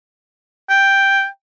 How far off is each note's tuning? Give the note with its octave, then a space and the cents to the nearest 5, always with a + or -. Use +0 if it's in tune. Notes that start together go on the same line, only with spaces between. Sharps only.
G5 +5